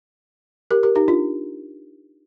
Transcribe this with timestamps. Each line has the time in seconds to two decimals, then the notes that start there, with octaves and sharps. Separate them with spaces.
0.71 G4 A#4
0.83 G4 A#4
0.95 D#4 G4
1.08 D4 F4